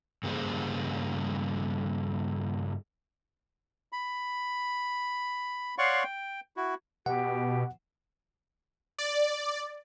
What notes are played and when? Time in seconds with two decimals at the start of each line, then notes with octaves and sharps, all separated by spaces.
0.23 G2 C#3 G3 A#3 G#4 C5
3.92 B5
5.78 C#5 D5 F5 F#5 C6 C#6
6.03 G5
6.57 E4 F#4
7.06 B2 G4 F#5
8.98 D5